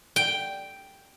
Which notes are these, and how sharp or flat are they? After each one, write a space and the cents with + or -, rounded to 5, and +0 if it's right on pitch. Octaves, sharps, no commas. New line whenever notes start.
G5 +0